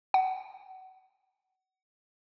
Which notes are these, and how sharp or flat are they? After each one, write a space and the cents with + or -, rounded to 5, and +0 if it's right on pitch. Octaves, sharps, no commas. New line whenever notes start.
F#5 +30